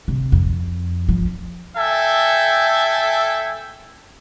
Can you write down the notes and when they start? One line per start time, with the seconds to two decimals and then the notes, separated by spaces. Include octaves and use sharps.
0.08 C3
0.32 F2
1.09 F3
1.77 A4 E5 G5 G#5